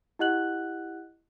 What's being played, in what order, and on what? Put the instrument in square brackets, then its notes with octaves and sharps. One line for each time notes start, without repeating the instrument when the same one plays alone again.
[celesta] E4 G4 D#5 F#5 F#6 F#7